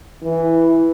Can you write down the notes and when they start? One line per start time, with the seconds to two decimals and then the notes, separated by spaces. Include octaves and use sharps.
0.22 E3